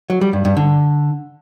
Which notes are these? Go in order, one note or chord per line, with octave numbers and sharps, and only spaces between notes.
F#3
G3
G2
G2
D3